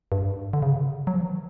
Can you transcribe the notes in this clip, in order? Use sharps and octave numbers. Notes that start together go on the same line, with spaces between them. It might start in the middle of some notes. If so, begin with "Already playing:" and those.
G2
G#2
D3
C#3
C3
C#3
F#3
F3
E3
D#3